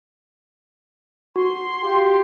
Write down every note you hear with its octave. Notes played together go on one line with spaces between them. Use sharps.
F#4 C6
F4 G4